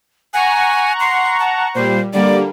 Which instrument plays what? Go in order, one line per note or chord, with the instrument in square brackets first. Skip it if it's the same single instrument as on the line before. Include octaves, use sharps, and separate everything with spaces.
[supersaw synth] F#5 A#5 C#6 [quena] G#5
[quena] C6
A5
[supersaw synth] A#2 G3 [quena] C5
[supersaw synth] D3 G3 A#3 [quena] D5